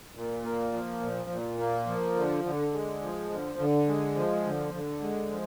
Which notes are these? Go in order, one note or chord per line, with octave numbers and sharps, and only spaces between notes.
A#2
A#3
F3
A#2
A#2
A#3
F3
D3
D3
G#3
F3
D3
D3
G#3
F3
D3
D3
G#3
F3